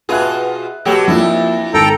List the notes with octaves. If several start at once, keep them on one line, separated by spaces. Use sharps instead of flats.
B2 F4 G#4 B4 E5 F#6
B2 F#3 A3 G4
F2 F3 A#3 D4 E4 F4
G#1 A4 G5 A#5